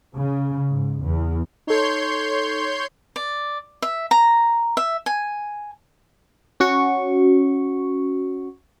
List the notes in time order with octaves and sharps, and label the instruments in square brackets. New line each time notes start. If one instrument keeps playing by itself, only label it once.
[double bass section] C#3
G#2
E2
[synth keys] D#4 A4 [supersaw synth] C#5 C6 G6
[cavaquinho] D5
E5
A#5
E5
G#5
[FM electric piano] C#4 F#4 C#6